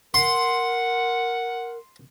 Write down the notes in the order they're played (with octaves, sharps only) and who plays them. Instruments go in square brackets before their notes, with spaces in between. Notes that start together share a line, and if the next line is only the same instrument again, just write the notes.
[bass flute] A#4 [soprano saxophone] F#5 [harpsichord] C6